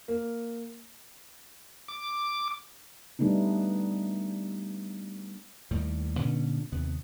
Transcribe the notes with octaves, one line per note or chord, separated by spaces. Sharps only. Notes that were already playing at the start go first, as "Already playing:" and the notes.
A#3
D6
G3 A3 B3 D4 D#4
D#2 A2 D#3 G3
A#2 D3 C#4
D#2 C3 B3